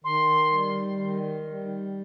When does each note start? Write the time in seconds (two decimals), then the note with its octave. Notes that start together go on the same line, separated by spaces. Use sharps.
0.04 D#3 C6
0.52 G3
1.00 D#3
1.47 G3